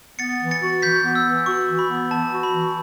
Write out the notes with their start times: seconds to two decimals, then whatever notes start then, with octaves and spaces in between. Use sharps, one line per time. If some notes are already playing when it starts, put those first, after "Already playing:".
0.19 B3 A6 C#7
0.40 E3
0.51 A6 C#7
0.62 F#4
0.82 E3 G6 B6
1.04 B3
1.15 E6
1.26 E3
1.46 F#4 C#6
1.68 E3
1.79 B5
1.89 B3
2.11 E3 A5
2.32 F#4
2.43 B5
2.53 E3